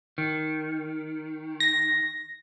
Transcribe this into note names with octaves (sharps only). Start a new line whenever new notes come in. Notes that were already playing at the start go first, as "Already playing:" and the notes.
D#3
A#6